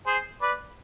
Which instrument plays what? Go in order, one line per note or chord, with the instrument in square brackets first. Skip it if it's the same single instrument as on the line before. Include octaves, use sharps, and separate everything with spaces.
[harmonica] G#4 C5
B4 D5